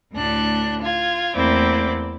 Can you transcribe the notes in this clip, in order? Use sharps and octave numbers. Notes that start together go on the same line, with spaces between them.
D2 A2 D4 F#6
F4 G#6
E2 A3 A#3 C4 E4 D5